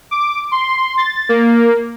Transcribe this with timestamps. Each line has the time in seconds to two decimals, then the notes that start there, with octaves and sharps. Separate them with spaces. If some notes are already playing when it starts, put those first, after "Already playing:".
0.11 D6
0.51 C6
0.98 A6
1.29 A#3